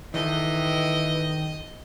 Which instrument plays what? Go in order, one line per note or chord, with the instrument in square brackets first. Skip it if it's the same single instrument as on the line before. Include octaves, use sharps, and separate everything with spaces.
[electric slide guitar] D#3 A4 [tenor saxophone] E3 [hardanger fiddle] D#5